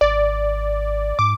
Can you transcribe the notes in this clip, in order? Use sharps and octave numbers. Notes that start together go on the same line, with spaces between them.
G#1 D5
G#2 D6